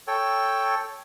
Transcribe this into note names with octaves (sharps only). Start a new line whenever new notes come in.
A4 C#5 G5